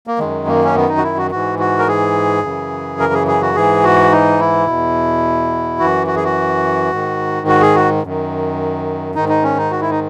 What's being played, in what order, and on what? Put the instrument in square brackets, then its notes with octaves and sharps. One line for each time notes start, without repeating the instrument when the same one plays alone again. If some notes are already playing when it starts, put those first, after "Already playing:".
[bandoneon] A#3
F#2 D#3 G#3
A#3
C#4
B3
D#4
F#4
E4
F#4
G#2 E3 F#4
F#4
A#4
G#4
F#2 C#3 E3
A#4
G#4
G#4
F#4
G#2 E3 G#4
F#4
D#4
E4
E2 B2
F#2 E3 F#4
F#4
G#4
F#4
G#2 D#3
F#4
G#4
F#4
F#2 D#3
G#2 D#3 D#4
D#4
C#4
D#4
F#4
E4
D#4